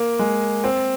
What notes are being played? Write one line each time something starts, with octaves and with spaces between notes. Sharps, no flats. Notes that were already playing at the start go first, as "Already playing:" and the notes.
Already playing: A#3
G#3
C4